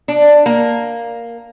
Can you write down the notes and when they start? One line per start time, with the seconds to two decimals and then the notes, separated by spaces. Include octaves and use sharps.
0.08 D4
0.46 A#3